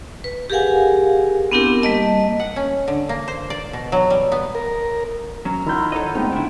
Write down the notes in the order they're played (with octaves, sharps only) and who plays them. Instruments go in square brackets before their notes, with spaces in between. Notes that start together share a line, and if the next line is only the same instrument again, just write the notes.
[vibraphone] B4
G4 G#4 A#4 F5 F#5 G#5
B3 C4 D4 E4 G4 A#4
G3 A#3 D#5 A5
[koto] F#5
C#4
D3
A#3
C5
D5
B2
F#3
G3
B3
[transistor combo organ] A#4
[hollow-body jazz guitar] F#3 C#4 [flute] A#5
[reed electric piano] D#3 G6 [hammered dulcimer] E4 F4 F#5
[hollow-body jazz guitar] A4 C#5 D#5
[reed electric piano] G#3 A3 C4 [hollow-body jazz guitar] B3 D#4 [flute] G5
[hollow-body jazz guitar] D3 E4